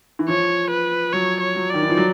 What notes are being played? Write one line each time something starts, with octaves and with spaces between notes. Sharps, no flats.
E3
F3 C#5
B4
F#3 C#5
C#5
F#3
D#3 D5
E3
F3
F#3